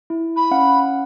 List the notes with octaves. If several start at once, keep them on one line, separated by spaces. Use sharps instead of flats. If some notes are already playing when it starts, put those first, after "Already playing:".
E4
B5
C#4 F5 F#5